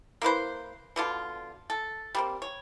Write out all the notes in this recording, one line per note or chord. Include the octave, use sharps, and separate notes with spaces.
A#3 E4 B4 C5
B2 D3 F4
A4
G3 A#3 C4
C#5